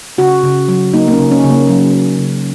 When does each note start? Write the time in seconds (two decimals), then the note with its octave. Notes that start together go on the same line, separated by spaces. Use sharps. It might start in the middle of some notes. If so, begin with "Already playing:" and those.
0.18 C#3 F#4
0.43 C#3
0.68 F#3
0.94 A#3 D#4
1.08 A#3
1.13 C#4
1.19 C#3
1.31 C#4
1.44 C#3
1.50 A#3
1.69 F#3
1.94 A#3
2.19 C#3